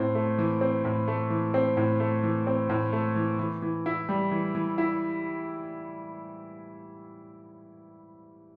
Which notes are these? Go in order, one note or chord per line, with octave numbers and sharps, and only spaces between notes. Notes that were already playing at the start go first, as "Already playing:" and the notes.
Already playing: A2 C4
A3
E3
C4
A2
A3
E3
C4
A2
A3
E3
C4
A2
A3
E3
E3
E3
E4
G3
E3
E3
E4